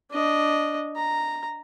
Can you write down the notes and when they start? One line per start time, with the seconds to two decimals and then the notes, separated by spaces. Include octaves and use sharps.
0.11 D4 D#5
0.96 A#5